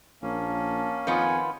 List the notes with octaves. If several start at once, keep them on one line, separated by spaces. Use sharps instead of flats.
A#1 A#3 C#4 A5
F2 D#3 B3 F4 G#5